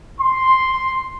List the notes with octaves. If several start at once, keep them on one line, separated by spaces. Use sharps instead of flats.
C6